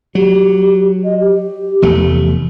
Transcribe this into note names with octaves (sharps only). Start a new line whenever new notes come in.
F#3 G4
D#5
G4
F1 E2 A3